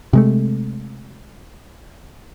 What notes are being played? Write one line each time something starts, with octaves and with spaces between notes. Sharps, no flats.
C3 G#3 A3